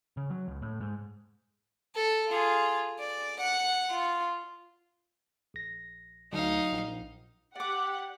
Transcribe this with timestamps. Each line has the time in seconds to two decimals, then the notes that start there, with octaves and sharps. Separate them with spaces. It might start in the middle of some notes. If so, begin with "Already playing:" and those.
0.17 C#3
0.30 F#3
0.48 C#2
0.62 A2
0.81 G#2
1.95 A4
2.28 F4 G#4
2.99 D5
3.39 F#5
3.91 F4
5.54 A#1 A#6
6.33 D2 F#3 D#4 F5
6.72 A#1
7.56 G4 D5 F#5 D6